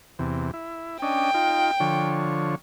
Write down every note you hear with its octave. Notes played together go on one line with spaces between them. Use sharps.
E2 C3
E4
C#4 D4 D#5 G5
D#4 F4
D3 F3 C#5